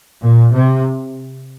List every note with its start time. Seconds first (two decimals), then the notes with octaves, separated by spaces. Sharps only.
0.23 A#2
0.54 C3